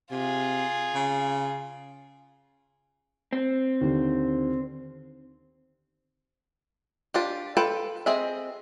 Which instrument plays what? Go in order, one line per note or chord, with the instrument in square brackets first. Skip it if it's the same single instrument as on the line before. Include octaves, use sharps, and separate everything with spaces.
[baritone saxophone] C3 [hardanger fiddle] F4 G#4
[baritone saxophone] C#3
[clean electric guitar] C4
[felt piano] D#2 D3
[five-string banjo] D4 F4 G4
F4 A4 B4 G5
C4 G#4 D#5 E5